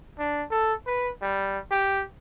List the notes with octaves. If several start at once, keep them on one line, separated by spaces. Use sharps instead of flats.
D4
A4
B4
G3
G4